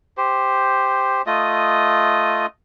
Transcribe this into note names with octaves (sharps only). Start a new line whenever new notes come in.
G4 C5
A3 F4 D#5 D#6